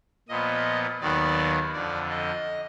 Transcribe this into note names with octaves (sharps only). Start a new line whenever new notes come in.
A#2 F3 B3 D#5
D#2 D#3 F#3 B3 D5
F2 D3 F3 D5
D#5